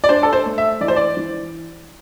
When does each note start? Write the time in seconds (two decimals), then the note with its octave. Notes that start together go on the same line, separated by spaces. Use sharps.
0.04 D5
0.09 D4 C5
0.23 A4
0.33 C5
0.46 A3
0.58 E5
0.81 E3 D5
0.88 C5
0.96 D5
1.17 E3